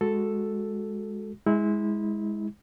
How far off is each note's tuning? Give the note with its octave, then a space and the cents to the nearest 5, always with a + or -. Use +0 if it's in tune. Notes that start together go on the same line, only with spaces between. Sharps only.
G#3 +0 F#4 +0 A4 +0
G#3 +0 E4 -25